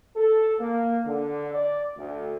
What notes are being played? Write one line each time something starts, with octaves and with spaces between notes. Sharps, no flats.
A4
A#3
D3
D5
D2